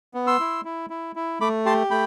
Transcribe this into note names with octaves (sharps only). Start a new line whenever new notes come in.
B3
C6 E6
E4
E4
E4
E4
A3 B5 D6
G4 A5 C6
A3 G5 B5